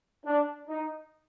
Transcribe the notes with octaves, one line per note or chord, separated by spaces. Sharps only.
D4
D#4